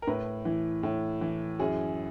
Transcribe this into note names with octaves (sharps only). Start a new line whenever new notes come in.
A#4
A2 B4
E3
A2
E3
F#2 G#4